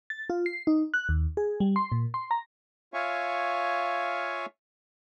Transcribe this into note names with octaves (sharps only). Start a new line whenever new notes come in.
A6
F4
C7
D#4
F#6
D#2
G#4
G3
C6
A#2
C6
A#5
F4 C#5 E5 F5 G#5 C#6